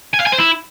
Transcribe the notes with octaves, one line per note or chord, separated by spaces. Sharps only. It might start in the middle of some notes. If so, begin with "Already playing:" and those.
G#5
F5
G#5
C5
E4